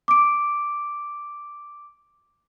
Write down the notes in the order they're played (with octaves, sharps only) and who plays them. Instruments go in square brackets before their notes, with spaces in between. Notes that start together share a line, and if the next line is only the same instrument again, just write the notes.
[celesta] D6 D7